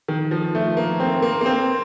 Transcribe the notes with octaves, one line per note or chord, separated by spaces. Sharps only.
D#3
F3
A3
A#3
C4
A#3
A#3
C4